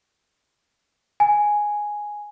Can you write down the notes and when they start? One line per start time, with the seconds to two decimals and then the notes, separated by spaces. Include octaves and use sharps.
1.20 G#5